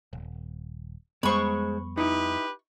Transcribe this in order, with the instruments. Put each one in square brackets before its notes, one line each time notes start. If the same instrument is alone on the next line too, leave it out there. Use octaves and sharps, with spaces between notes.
[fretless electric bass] D#1
[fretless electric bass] F2 G3 B3 [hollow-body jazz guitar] G#3 C5 [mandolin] B5 C#6
[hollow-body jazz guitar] D#4 E4 [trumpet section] G4 B4